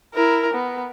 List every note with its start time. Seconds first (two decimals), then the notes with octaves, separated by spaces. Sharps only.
0.14 E4 A#4
0.54 B3